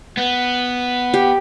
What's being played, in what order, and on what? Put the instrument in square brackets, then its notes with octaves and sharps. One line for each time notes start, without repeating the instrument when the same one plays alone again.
[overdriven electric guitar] B3
[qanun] G4